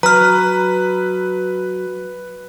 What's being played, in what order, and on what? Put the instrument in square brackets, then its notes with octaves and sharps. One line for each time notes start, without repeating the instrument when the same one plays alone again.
[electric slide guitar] F#3 [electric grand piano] B4 [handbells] A#5 F6